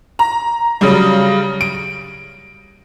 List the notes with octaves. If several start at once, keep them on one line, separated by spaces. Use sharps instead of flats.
A#5
C#3 F#3 G3
D7